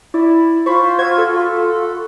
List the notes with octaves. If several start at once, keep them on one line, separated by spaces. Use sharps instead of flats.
E4 D5
F4 C5 B5 C#6
F#4 E5 G#6
A4